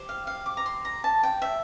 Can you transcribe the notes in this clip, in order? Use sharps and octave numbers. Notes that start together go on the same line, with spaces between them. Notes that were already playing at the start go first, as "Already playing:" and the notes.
Already playing: G4 C5
F5
F5
D6
A#5
C6
A#5
A5
G5
E5